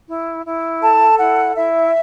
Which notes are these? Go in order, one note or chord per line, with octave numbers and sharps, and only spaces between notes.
E4
E4
A4 A5
E4 F#5
E4 E5